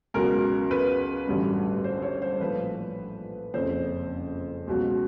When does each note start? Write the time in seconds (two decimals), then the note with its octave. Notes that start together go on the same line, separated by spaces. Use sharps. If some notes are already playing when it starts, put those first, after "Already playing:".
0.14 C#2 B2 F#3 A#4
0.71 B4
1.27 A1 G2 D3 F#3
1.84 C5
2.02 C#5
2.22 C5
2.40 A#1 A2 F3 B4
3.54 F#1 F2 C#3 C5
4.67 C#2 B2 F#3